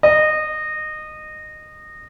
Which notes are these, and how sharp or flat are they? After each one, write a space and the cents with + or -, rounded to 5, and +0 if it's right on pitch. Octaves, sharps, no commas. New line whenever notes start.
D#5 -20